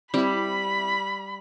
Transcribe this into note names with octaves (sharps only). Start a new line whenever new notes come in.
G3 C4 E4 B5